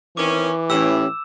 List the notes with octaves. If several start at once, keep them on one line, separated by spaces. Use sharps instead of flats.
D#3 E3 C4 C#4 D6
A2 C#4 G4 E6 E7